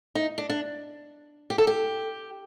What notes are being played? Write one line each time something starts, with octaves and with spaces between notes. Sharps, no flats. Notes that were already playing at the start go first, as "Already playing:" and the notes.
D#4
D4
D4
G4
A4
G4